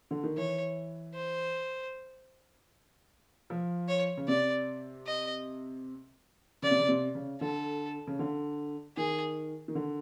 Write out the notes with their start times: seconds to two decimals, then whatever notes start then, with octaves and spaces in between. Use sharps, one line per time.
0.11 D3
0.24 D#3
0.37 E3 C#5
1.15 C5
3.50 F3
3.88 C#5
4.17 C#3
4.28 C3 D5
5.06 D#5
6.62 C#3 D5
6.71 C3
6.79 C#3
6.89 C3
7.15 C#3
7.41 D3 A4
8.07 C#3
8.19 D3
8.97 D#3 G#4
9.68 D#3
9.75 D3